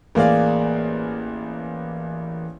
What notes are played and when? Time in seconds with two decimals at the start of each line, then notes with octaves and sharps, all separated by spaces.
0.15 A1 A#3 G#4 D5 F5